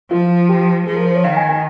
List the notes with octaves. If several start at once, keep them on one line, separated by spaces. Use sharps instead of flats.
F3 F4
G4
F3 G#4
A#4
C5
C#5
D#3 F5
G#5
G#5